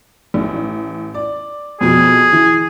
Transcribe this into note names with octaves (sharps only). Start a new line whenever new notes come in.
A1
D5
F2 B2 G#4
E3